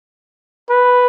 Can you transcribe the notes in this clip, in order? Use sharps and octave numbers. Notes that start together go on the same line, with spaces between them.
B4